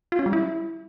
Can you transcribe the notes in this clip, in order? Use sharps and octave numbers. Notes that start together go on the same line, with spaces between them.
F4
C#4
G3
E4